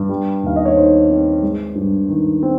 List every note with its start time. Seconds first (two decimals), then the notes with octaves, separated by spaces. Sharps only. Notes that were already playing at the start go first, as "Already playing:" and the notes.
Already playing: G2
0.09 G3
0.43 D#2 F5
0.56 D#5
0.65 C#5
0.76 D#3 C5
1.10 C4
1.43 G#3
1.75 G2
2.09 D#3
2.43 C4